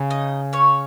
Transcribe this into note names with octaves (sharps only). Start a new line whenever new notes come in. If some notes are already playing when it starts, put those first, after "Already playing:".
Already playing: C#3
D#4 D#5
C#4 C#5